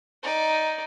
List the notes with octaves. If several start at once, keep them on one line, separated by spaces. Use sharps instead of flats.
D#4 D5